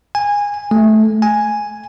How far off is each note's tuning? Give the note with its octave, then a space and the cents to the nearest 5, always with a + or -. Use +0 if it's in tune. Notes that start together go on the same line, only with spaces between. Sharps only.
G#5 -20
A3 -15
G#5 +0